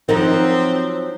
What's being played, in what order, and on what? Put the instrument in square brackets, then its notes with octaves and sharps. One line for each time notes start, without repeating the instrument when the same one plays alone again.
[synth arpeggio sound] D#3 [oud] F3 F#3 D#4 [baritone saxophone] C4